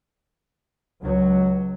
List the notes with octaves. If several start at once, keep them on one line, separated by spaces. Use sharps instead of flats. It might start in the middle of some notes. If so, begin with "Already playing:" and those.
C#2 F#3